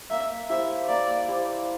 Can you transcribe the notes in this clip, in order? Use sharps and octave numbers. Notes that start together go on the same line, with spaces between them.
A#3 E5
E4 G4 C5 E5
A#3 D5
E4 G4 C5